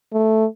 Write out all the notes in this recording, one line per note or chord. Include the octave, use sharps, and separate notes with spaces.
A3